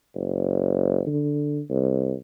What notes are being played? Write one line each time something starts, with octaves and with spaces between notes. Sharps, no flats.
F#1
D3
C2